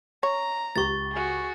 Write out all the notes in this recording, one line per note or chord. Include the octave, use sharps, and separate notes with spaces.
C#5 A#5
C#2 G4 C#6 A6
F#4 G#4